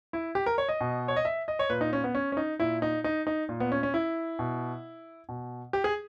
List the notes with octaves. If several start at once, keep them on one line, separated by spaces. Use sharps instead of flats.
E4
G4
A#4
C#5
D#5
B2
C#5
D#5
E5
D#5
C#5
A#2 B4
D#4
C#4
B3
C#4
C#4
D#4
A#2 E4
D#4
D#4
D#4
A#2
B3
C#4
C#4
E4
B2
B2
G4
G#4